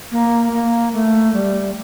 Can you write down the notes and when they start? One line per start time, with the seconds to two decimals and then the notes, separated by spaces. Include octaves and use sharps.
0.12 A#3
0.52 A#3
0.93 A3
1.34 G3